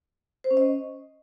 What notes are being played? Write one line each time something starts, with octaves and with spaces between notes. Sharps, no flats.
C5
C#4
D#5